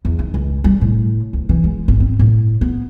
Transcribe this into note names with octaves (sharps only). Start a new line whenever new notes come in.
E2
D#3
C#2
G3
A2
D2
E3
G#3
G#1
C4
A2
B3